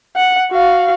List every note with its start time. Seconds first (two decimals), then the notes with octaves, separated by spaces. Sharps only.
0.16 F#5
0.52 F#4 F5